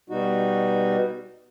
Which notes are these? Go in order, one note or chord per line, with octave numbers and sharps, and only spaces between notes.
B2 G3 D#4 F#4